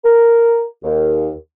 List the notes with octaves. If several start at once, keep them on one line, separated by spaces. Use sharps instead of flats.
A#4
D#2